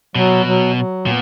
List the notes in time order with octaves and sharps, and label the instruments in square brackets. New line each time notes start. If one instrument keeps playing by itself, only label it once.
[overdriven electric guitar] B2 [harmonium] F#3
[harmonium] F#3
F#3
[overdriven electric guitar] A#2 [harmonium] B3